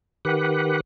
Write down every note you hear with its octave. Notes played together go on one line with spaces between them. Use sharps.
D#3 G4 B4 F#5